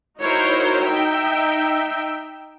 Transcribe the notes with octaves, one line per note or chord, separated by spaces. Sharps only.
D#4 E4 F#4 A#4 C5 C#5
D#4 E5 G5